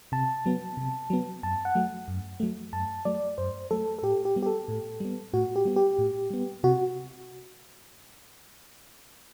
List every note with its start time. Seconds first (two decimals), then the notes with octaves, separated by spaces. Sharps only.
0.12 C3 A5
0.46 F#3 B3
0.77 C3
1.10 F#3 B3
1.43 F#2 A5
1.65 F#5
1.75 F#3 A3
2.08 F#2
2.40 F#3 A3
2.73 F#2 A5
3.05 F#3 A3 D5
3.38 F#2 C5
3.71 F#3 A3 A4
3.99 A4
4.03 A2 G4
4.25 G4
4.36 G3 B3
4.42 G4
4.46 A4
4.68 A2
5.00 G3 B3
5.33 A2 F#4
5.56 G4
5.65 G3 B3
5.76 G4
5.98 A2
6.30 G3 B3
6.64 C3 F#4